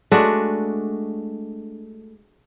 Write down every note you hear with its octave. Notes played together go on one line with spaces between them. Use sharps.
G#3 A3 D4 F#4